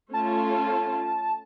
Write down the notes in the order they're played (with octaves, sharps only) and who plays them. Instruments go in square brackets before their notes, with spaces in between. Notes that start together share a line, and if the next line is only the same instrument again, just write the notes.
[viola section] A3 C#4 F4 [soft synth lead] A5